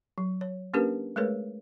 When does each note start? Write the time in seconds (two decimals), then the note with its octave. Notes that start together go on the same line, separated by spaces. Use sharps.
0.18 F#3
0.41 C#5
0.74 A#3 C#4 D4 G4 A#4 B4
1.16 G#3 A3 G#4 A#4 B4 C#5